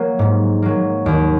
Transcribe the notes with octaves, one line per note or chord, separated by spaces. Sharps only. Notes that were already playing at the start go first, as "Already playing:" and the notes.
Already playing: F#3 A#3
G#2
F#3 A#3
D#2